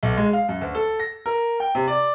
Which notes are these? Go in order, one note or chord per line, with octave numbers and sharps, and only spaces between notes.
B1
G#3
F5
F#2
D2
A4
A#6
A#4
G5
C3
D5